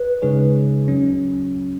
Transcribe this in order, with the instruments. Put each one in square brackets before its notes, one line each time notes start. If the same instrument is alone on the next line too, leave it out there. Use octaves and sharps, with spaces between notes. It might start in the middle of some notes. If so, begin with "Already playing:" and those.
Already playing: [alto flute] B4
[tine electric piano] C#3 G#3 D#4 G#4 C#5
F#3 C#4